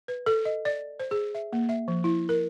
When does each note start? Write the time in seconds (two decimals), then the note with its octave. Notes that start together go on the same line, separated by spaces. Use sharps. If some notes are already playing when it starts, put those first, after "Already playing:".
0.08 B4
0.26 A4
0.45 D#5
0.65 D5
1.00 C5
1.11 G#4
1.35 E5
1.53 A#3
1.69 E5
1.88 F3
2.04 E4
2.29 A#4